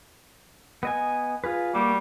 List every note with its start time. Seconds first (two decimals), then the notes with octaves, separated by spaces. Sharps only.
0.83 B3 D#5 G#5
1.44 F4 G#4 B4
1.75 G3 A#3 F#4 D6